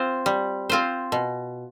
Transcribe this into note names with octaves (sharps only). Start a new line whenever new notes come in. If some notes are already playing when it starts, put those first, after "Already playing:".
Already playing: C4 F4 C5
G3
C4 F4 C5
B2